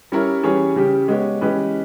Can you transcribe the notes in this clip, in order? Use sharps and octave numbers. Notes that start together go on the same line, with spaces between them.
G3 C#4 E4 A#4 C#5
E3 G3 C#4 G#4 C#5
C#3 G3 C#4 G4
G#3 B3 G4 C#5
E3 G#3 C#4 G4 B4